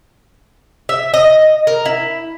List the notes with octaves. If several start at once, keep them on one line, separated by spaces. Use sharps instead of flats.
E5
D#5
A#4
E4